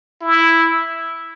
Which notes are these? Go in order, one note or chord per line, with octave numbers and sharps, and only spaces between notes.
E4